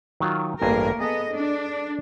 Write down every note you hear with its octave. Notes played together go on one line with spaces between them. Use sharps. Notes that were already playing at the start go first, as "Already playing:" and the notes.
D#3 F#3 F4
A1 G2 A3 A#3 G#4 A#4
B3 G#4 A4 D#5
D4